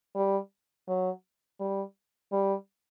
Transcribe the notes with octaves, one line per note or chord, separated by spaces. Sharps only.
G3
F#3
G3
G3